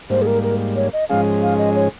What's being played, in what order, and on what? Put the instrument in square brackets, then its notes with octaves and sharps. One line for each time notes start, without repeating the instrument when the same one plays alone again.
[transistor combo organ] G#2 G3 A#3 [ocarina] C5
[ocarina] G#4
A#4
A#4
C#5
D#5
[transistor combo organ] G#2 F3 G#3 C#4 G#4 [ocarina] F5
[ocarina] F5
D#5
C#5